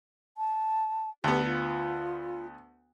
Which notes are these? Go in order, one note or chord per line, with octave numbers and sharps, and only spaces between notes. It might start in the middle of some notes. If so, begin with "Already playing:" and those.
A5
D2 B3 G4
F4